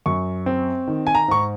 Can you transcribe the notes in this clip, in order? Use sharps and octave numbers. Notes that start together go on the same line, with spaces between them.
F#2 C#6
C4
D#3
G#5
A#5
G#2 C#6